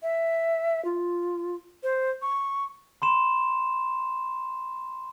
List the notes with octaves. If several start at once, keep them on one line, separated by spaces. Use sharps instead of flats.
E5
F4
C5
C#6
B5 C6 E7